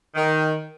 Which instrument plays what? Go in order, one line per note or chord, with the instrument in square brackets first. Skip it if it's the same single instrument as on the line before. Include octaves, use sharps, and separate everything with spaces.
[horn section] D#3